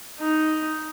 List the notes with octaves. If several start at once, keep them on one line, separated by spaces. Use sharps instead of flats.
D#4